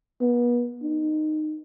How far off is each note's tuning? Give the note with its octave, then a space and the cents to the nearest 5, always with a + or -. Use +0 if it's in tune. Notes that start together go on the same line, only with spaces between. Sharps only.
B3 -35
D#4 -15